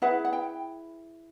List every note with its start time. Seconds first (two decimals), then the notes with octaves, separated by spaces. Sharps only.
0.02 E4 G#4 B4 F#5
0.25 F#5
0.33 G5